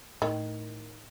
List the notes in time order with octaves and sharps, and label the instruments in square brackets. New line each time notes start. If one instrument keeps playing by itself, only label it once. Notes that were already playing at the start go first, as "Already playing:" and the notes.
[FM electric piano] A2 [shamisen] D#3